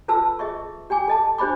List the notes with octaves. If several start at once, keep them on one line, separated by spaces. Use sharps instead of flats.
F4 A4 B4 A5 E6
G#4 D#5 E5 C#6
G4 G5 G#5 D6
A4 D#5 A5
D4 G4 C5 D#5 B5 D6